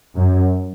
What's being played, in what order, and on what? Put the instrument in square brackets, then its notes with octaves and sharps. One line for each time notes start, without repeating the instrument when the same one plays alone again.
[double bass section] F#2